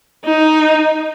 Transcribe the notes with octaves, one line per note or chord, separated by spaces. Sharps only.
D#4